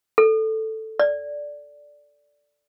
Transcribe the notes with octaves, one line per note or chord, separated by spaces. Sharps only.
A4
D5